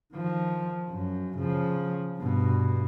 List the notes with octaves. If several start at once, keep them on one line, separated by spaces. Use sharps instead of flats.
D#3 F3
F#2
C#3 F3
G2 B2